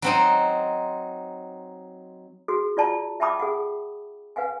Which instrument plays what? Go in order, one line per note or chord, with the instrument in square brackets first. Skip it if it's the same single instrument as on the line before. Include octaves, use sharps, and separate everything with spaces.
[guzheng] F#3 C4 D#4
[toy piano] F#4 G#4
F4 D5 A5 A#5
E5 G5 A5 B5 D6 D#6
G#4 F#5
B4 F5 F#5 G#5